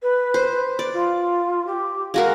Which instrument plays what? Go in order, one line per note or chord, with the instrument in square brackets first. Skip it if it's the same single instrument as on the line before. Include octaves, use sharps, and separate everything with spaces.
[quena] B4
[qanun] C5
D5
[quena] F4
G4
[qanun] G#3 F#4 A#4 [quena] F5